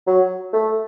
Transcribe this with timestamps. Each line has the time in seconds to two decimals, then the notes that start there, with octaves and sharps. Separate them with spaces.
0.07 F#3
0.53 A3